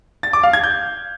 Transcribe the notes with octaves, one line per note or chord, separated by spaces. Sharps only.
A6
D6
F5
G#6
G6